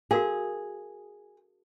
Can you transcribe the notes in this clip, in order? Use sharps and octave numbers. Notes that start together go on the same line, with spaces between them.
F#4 G#4 A#4 F5